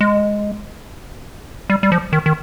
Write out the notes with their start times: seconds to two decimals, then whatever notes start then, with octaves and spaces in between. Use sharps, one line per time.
0.01 G#3
1.70 G3
1.83 G3
1.92 F3
2.13 D#3
2.26 D#3